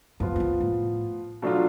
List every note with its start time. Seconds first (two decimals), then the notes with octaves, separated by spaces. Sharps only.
0.20 F#2 F3 B3 F4
0.36 G#2
0.40 F#2
0.60 A2
1.42 B2 F#3 A3 D4 F4